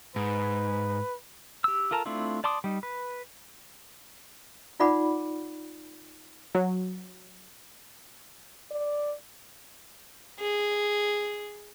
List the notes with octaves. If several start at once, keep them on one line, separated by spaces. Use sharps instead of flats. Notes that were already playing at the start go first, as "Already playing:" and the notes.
G#2 B4
G4 E6
F4 A4 A#4 A5 A#5
A3 C4 D4 E4 F4
D5 A5 C6 D6 D#6
G3 D#4
B4
D#4 F4 D5 F#5 B5 D6
F#3
D5
G#4